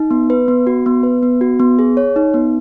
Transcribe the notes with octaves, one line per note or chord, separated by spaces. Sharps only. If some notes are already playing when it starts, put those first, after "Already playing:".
Already playing: D#4
B3
B4
B3
F#4
B3
B4
B3
F#4
B3
G#4
C#5
D#4
B3